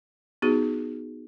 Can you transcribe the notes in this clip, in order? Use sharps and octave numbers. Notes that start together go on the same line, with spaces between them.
B3 D#4 F#4 G#4